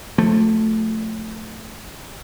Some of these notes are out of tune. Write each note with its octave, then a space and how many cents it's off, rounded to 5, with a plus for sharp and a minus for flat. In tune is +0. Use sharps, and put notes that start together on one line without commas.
F3 +40 A3 +0